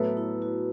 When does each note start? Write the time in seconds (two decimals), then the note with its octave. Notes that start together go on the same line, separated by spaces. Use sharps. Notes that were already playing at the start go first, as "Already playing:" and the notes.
Already playing: A2 F#3 B3 A4 B4 E5
0.17 E4
0.42 F#4